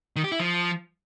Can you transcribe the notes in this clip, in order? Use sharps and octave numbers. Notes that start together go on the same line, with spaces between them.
D#3
G4
E4
F3